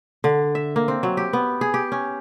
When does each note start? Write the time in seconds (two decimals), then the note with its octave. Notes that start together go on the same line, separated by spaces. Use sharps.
0.24 D3
0.55 E5
0.76 A#3
0.88 C4
1.03 F#3
1.17 G4
1.33 B3
1.61 G#4
1.74 G4
1.92 C#4